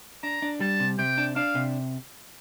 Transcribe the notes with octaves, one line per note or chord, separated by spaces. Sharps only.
D4 A#5
D4
G3 A5
C3
C3 G5
D4
D4 F5
C3